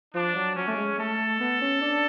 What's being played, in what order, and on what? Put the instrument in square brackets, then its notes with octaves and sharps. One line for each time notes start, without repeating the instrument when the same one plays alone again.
[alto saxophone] F3 [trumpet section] D4
[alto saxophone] F#3
[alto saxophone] F#3 [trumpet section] C#4
[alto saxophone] A3
G#3
[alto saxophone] A3 [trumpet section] A4
[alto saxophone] B3
C#4
D4